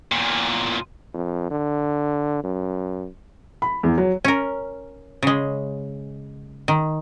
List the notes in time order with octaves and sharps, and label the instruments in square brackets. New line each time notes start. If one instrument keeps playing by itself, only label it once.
[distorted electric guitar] E2 A#2
[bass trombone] F2
D3
F#2
[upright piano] B5
E2
F#3
[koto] C#4 A#4
C#3 G#3
D#3